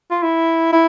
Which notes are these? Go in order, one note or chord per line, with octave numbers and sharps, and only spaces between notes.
F4
E4
E4